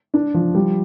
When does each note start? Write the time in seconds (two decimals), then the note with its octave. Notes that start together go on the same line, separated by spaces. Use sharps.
0.14 D4
0.34 F3
0.55 G3